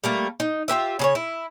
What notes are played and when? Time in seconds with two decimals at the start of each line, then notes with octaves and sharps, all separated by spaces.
0.04 G3 A3 A#3
0.40 D#4
0.68 F4 G4 B4 E5
0.99 C#3 G#4 C#5
1.15 E4